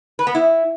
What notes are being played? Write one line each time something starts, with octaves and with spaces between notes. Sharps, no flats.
B4
B3
E4